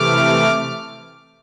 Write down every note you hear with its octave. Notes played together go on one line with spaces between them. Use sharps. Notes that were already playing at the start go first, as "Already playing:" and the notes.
Already playing: C3 E3 A3 D6 F6